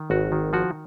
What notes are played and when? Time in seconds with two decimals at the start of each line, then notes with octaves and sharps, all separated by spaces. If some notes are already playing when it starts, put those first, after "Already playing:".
Already playing: D#3
0.10 G#1 F#4
0.32 D#3
0.53 F3 F#4